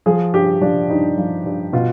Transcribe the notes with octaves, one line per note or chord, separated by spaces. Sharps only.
F3 G#4
G2 G4
F3 D4
G2 D#4
F3
G2
B2 F4